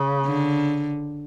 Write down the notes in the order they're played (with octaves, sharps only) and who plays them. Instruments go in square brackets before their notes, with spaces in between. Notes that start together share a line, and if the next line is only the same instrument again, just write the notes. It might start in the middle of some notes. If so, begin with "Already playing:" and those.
Already playing: [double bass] C#3
[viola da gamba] D3